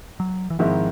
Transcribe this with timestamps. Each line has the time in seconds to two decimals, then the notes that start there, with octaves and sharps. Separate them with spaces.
0.20 F#3
0.50 E3
0.59 G#2 D#3 F3 G#3 C4 E4